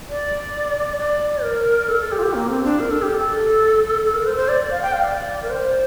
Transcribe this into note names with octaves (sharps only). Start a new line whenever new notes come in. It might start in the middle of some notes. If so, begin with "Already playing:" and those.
D5
D5
A#4
A4
A4
G4
F4
G4
A#3
C4
D4
A#4
A4
G4
A4
A4
A#4
C5
C5
D5
F5
G5
F5
D5
A#4
C5